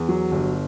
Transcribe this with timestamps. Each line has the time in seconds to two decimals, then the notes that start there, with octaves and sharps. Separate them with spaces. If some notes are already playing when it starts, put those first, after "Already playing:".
Already playing: E2
0.09 F#3
0.32 G1